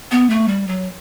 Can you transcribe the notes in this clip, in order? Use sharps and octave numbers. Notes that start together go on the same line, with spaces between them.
B3
A3
G3
F#3